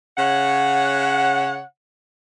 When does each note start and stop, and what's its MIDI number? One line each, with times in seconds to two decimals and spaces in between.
0.18 1.61 49
0.18 1.61 73
0.18 1.61 78